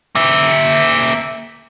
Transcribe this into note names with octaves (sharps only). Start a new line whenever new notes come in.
A#3 E5